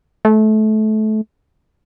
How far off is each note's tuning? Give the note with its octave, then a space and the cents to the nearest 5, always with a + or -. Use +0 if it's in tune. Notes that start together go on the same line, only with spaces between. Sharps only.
A3 -25